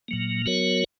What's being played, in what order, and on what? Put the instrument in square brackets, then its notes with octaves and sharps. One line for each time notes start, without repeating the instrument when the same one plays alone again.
[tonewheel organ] A#2 F#3 A#3
F#3 B3 F#4 A#4 C#5